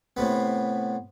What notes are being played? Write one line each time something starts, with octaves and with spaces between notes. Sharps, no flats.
A2 C3 B3